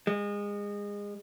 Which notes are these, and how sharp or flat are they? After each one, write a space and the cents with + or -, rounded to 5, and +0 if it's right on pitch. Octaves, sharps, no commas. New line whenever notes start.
G#3 -25